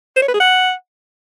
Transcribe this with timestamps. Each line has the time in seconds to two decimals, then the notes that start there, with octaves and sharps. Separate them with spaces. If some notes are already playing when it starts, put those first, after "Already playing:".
0.16 C5
0.22 C#5
0.28 B4
0.34 G#4
0.40 F#5